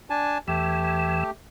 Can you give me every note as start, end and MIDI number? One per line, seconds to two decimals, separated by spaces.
0.10 0.38 62
0.10 0.38 80
0.10 0.38 81
0.48 1.23 40
0.48 1.23 52
0.48 1.31 57
0.48 1.31 67